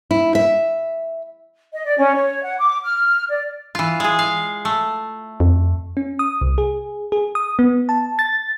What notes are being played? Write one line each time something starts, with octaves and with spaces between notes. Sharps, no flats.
E4
E5
D#5
D5
C#4
C#5
F#5
D6
F6
D5
E3 F4
G#3 G#4
F5
A3
F2
C#4
D#6
C2
G#4
G#4
D#6
B3
A5
A6